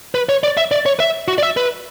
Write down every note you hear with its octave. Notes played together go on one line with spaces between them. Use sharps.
B4
C#5
D5
E5
D5
C#5
E5
F#4
D5
E5
B4